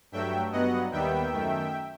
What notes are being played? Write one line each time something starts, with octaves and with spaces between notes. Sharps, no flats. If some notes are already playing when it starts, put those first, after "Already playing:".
G2 F#3 A3 E5 G5
G2 F#3 B3 D#5 F#5
D#2 D#3 G3 B3 E5 G5
F#2 D#3 A3